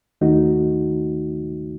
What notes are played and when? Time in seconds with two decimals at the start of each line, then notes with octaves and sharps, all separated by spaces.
0.21 D#2 D#3 A3 D#4 F#4